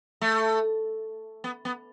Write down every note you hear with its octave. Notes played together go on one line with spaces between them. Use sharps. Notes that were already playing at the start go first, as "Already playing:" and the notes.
A3
B3
B3